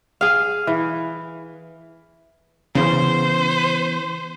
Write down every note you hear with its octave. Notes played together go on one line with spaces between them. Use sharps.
G#4 F5
E3
C#3 E3 B3 C5